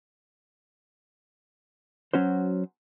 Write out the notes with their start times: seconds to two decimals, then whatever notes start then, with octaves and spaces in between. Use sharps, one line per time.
2.14 F#3 C#4 F#4 C5